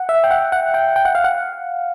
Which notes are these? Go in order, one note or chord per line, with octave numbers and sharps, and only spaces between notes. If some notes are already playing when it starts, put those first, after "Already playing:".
Already playing: F#5
E5
G5
F#5
F#5
G5
G5
F#5
F5
F#5